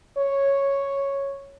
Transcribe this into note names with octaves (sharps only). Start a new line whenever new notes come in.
C#5